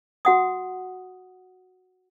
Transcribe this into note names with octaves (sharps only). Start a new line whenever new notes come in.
F#4 F#5 D#6